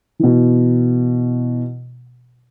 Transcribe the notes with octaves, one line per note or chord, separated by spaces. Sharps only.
B2 E3